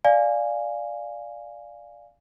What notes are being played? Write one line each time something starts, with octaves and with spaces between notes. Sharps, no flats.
D5 F5 G#5